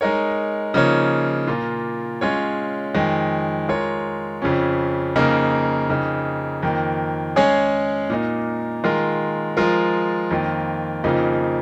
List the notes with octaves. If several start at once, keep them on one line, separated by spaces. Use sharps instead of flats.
G#3 D#4 A#4 C#5
C#3 F3 A#3 D#4 C#5
A#2 A#3 F4
G#3 C#4 F4 C#5
F2 D#3 G#3
G#3 F4 A#4 C#5
F2 C#3 F3 C#4
F2 C#3 A#3 D#4 A#4
F2 C#3 A#3 D#4
F2 D#3 A#3
G#3 C#4 G#4 C#5
A#2 A#3 D#4
D#3 G#3 F4 A#4
F3 G#3 F4 A#4
F2 D#3 A#3 F4
F2 C#3 F3 A#3 D#4